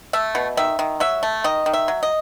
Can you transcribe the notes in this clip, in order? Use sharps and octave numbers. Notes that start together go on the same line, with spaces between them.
A3 E5
B2
D#3 E5
D#3
F#3 E5
A3
D#3 D#5
D#3
E5
F#3
D#5